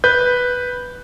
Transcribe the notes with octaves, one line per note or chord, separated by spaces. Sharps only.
B4 G6